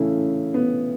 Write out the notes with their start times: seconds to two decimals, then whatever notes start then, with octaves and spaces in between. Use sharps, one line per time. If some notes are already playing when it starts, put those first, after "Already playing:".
Already playing: A2 C#3 E3 A3 C#4 E4
0.54 B3